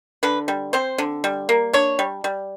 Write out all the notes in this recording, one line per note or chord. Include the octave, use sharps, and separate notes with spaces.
D3 B4
G3
C4 C5
D3
G3
A#3
D4 C#5
G3
G3